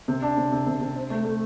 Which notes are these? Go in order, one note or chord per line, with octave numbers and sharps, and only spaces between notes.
C3
D4
C3
C3
C3
C3
C4
A3
A3